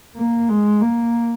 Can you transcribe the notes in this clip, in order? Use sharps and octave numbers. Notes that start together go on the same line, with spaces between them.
A#3
G#3
A#3